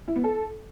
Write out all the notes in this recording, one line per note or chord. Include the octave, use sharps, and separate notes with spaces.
E4
B3
A4